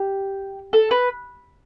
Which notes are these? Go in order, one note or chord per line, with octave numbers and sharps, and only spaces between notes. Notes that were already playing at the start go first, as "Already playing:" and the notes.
Already playing: G4
A4
B4